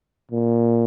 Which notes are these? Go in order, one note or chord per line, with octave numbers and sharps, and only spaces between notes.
A#2